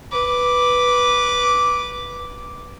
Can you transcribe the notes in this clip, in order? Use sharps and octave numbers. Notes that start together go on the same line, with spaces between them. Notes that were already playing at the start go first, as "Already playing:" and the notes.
B4 D6